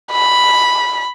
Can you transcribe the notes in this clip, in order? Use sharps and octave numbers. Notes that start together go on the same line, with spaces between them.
B5